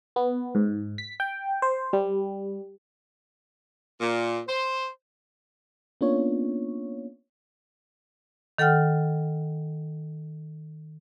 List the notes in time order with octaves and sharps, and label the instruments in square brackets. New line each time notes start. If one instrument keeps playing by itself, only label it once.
[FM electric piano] B3
G#2
B6
G5
C5
G3
[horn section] A#2
C5
[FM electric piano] A#3 B3 C#4 D4 F4 C#5
[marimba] D#3 A4 F#5 G5 F6